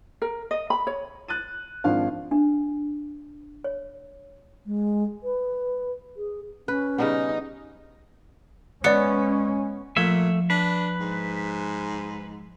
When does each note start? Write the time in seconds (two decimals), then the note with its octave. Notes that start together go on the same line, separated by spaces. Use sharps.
0.22 A#4
0.51 D#5
0.70 B5
0.87 C#5
1.28 F#6 A6 D#7
1.84 G#1 F3 D4 F5
2.31 D4
3.64 C#5
4.66 G#3
5.23 B4
6.17 G#4
6.68 C#4 B4
6.98 C#3 G3 B3 D#4
8.84 G#3 B3 C#4 D5 C#7
9.97 A#2 F3 A3 E5
10.50 D4 B4
11.00 G#2